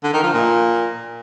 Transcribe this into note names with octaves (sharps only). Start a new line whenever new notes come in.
D3
D#3
F3
A#2